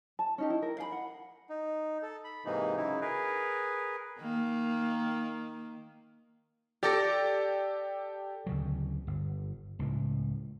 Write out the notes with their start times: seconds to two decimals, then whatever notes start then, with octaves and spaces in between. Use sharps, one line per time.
0.19 A5
0.38 C#4 D#4 G4
0.50 E4
0.62 A#4
0.78 F5 G5 B5
0.92 F#5
1.49 D#4
2.02 A4
2.24 B5
2.45 G#2 C3 E3 A#3 D#4
2.76 C#3 F#3 D#4 E4
3.01 G#4 A#4 B4
4.20 D#3 A#3
6.83 G4 A4 D5 A#6
8.46 D2 C#3 F#3
9.07 G1
9.79 C#2 A2